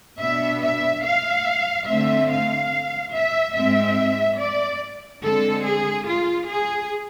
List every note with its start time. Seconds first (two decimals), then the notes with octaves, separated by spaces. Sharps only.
0.20 B2 B3 D4 E5
0.62 E5
1.04 F5
1.87 D3 A3 C4 E5
2.29 F5
3.13 E5
3.54 G#2 G#3 C4 E5
4.39 D5
5.22 D3 G#3 C4 A4
5.64 G#4
6.06 F4
6.48 G#4